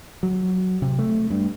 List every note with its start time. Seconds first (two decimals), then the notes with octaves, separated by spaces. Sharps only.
0.23 F#3
0.82 C3
0.99 A3
1.30 G2